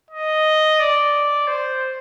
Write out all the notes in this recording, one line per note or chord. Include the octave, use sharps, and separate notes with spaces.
D#5
D5
C5